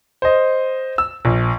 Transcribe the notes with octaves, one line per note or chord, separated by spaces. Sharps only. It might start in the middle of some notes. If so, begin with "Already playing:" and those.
C5 D#5
E6
A#1